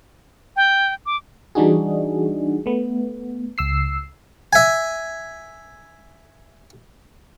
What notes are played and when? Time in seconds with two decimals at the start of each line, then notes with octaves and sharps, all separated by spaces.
0.56 G5
1.06 D6
1.55 E3 G3 D4 D#4 F#4 G#4
2.66 A3 B3
3.58 C#2 E6 C7
4.53 E5 G#5